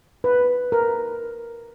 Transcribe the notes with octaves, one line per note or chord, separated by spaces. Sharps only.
B4
A#4